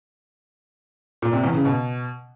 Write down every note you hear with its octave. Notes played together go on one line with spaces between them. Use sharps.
A#2
C3
E2
C#3
B2